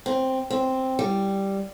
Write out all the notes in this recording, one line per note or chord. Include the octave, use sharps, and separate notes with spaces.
C4
C4
G3